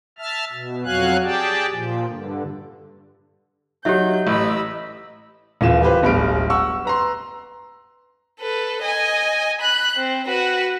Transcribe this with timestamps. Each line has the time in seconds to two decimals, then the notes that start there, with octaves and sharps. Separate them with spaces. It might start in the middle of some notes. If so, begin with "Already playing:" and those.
0.18 E5 A5 F6
0.52 B2
0.84 F2 F#3 F#4 F5 G#5 F#6
1.24 G4 G#4 D5 G5 A5
1.73 A#2 F3
2.09 G2 D3
3.85 F#3 D#4 G4 E5 G6
4.27 A1 D#5 B5 E6
5.61 D#1 E3 F4 E7
5.82 F4 G4 B4 C5
6.02 D1 G1 G3 B5 D7
6.50 F#5 C#6 E6
6.85 B4 A#5 C6
8.40 A4 B4
8.83 D#5 G#5
9.61 B5 F#6
9.97 C4
10.26 F#4 B4